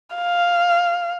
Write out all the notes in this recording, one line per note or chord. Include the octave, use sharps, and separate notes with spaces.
F5